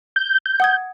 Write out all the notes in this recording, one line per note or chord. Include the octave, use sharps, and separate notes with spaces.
G6
G6
F#5 D#6 G#6